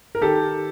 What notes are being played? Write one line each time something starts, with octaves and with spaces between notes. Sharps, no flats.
A#4
D#3 G4 A4